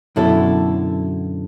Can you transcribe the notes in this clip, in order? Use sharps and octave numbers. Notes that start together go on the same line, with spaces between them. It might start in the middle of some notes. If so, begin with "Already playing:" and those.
F#2 B2 D3 E4 A4